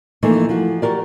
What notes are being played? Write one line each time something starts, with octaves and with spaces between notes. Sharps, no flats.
E3 F3 A3 A#3 D#4
F3 F#4
F#4 G4 A#4 D5